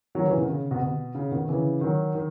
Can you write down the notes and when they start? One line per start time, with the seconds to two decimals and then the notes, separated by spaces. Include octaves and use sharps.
0.15 D#3 F#3
0.26 C#3 E3
0.37 B2 D#3
0.49 C#3
0.71 B2
0.82 B2
1.15 C#3
1.32 B2 D#3
1.48 C#3 E3
1.81 D#3 F#3
2.15 D#3